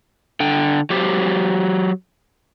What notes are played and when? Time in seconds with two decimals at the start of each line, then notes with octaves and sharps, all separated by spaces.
0.40 D3 G5
0.90 F#3 G4 C5